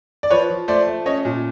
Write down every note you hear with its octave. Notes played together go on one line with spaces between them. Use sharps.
D5
F3 B4 C#5
F3
A3 C5 D5
A3
C#4 C#5 D#5
A#2